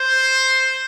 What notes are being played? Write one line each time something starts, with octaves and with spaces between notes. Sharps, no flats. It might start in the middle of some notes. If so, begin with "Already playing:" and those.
Already playing: C5